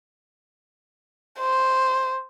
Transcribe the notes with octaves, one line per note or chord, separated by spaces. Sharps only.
C5